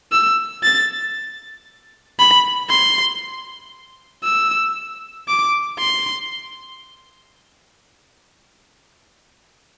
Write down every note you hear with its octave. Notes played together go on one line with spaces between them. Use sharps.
E6
A6
B5
C6
E6
D6
C6